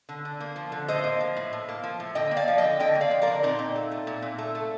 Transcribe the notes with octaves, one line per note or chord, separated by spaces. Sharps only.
D3
D3
A#3
F3
D3
A2 C5 D#5
A#3
F3
A2
A2
A#3
F3
A2
D3 D#5 G5
A#3
D5 F5
F3
D#5 G5
D3
D3 D#5 G5
A#3
D5 F5
F3
A#4 D5
D3
A#2 C4 D#4
A#2
A3
A3
A#2
A#2
A3
A3